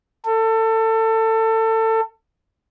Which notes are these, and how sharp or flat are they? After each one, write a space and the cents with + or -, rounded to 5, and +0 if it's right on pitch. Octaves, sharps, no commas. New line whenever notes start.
A4 +25